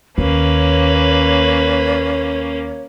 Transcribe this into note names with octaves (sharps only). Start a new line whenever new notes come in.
D#2 A#3 C#4 B4 C#5